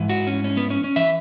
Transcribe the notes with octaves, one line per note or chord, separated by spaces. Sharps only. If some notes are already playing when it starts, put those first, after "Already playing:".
Already playing: G#2 E3
F#4
C#4
C#4
B3
C#4
C#4
E3 E5